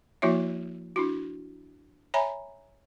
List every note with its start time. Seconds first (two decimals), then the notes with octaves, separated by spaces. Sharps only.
0.22 F3 A#3 E4 F#4 C#5 E5
0.96 D4 E4 F#4
2.14 C#5 E5 G#5 A#5 B5